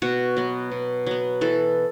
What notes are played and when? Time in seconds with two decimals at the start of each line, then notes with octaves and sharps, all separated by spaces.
0.02 B2 F#4
0.37 F#3 B3
0.71 B2
1.07 F#3 B3
1.41 E3 A4